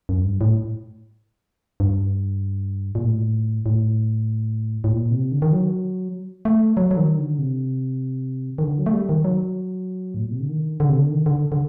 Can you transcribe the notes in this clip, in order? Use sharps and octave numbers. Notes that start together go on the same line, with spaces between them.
F#2
G2
A2
G2
A#2
A2
A2
A2
A#2
C3
D3
D#3
F#3
A3
F#3
F#3
D#3
D3
C3
D#3
D3
F#3
A3
G3
D#3
F#3
A2
A#2
C3
D3
D#3
D3
C3
D3
D#3
D3
D3